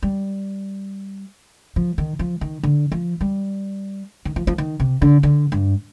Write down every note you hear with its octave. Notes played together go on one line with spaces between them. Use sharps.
G3
F3
D#3
F3
D#3
D3
F3
G3
D#3
F3
F3
D#3
C3
D3
D3
G2